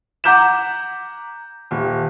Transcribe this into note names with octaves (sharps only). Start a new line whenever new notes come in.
F#5 A#5 D6 G6 B6 E7
D#1